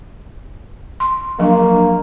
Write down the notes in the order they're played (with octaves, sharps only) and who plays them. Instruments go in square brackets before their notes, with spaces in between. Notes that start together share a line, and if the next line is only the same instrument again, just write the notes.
[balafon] C6
[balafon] F3 F#3 D4 [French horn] A#3